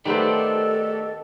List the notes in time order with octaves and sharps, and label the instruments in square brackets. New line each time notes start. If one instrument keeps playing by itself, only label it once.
[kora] D#3 B3 C5 [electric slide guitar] A3 D4 G4 [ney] A4 [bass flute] D#5